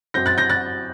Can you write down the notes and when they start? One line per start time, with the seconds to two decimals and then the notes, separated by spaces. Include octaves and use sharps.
0.14 F#2 F#3 C4 G6 A#6
0.26 F#6 A6
0.38 G6 A#6
0.50 F#6 A6